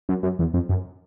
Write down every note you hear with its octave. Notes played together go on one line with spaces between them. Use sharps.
F#2
F#2
E2
F2
F#2